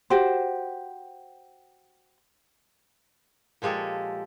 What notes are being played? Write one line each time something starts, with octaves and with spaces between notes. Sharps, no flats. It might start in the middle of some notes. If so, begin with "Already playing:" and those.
F#4 G4 C5
A#2 F3 G#3 G4 A4